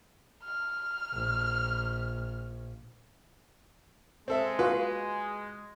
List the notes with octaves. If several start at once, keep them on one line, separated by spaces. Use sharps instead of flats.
F6
A#1
G#3 C4 A4 E5
F4 F#4 B4